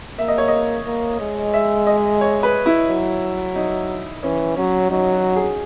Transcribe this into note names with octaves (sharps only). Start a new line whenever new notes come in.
A#3 E5
D#5
C#5
D#5
A#3
G#3
E5
D#5
C#5
B4
E4
F#3
D#4
E3 C#4
F#3 C#4
F#3 D#4
F#4
G#4